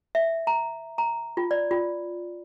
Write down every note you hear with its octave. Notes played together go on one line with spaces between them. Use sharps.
E5
A#5
A#5
F4
D5
F4